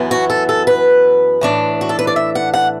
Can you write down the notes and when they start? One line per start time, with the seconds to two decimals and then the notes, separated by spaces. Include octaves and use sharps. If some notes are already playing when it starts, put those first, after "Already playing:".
Already playing: F#2 E3 B3
0.11 F#4
0.30 A4
0.49 A4
0.67 B4
1.41 A2 E3 D4
1.81 F#4
1.89 A4
1.99 B4
2.07 D5
2.16 E5
2.35 F#5
2.54 F#5